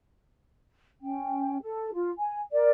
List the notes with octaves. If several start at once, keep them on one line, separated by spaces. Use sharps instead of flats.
C#4 G5
A4
F4
G#5
A#4 D5